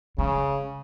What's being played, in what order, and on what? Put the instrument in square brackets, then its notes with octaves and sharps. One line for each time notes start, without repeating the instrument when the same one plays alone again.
[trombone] C#3 [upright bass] G#3